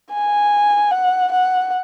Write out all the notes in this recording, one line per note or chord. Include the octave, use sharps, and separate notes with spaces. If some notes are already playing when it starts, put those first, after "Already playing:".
G#5
F#5
F#5